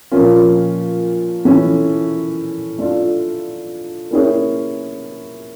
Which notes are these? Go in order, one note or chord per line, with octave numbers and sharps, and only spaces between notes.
A#2 F3 A#3 C#4 F4
E3 A3 C#4
A3 D4 F4
A#3 C#4 E4 G#4 C#5